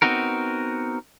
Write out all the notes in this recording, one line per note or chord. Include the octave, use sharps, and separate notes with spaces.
B3 C4 D#4 F#4 A#4